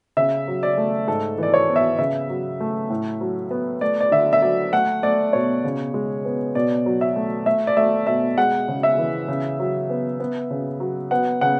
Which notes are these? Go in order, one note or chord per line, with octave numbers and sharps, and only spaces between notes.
C#3 E5
F#3
D5
A3
G#2 A4
E3 D5
C#5
B3
E5
C#3 E5
F#3
A3
A2
F#3
B3
A3 D5
D5
D3 E5
E5
F#3 D5
A3 F#5
A3 D5
B2 C#5
C#3
G#3
B3
B2 D5
F#3
E5
A3
A3 E5
D5
A3 E5
B2 E5
G#3 F#5
C#3
E5
E3
C#3
F#3
B3
B3
C#3
F#3
B3 F#5
C#3 F#5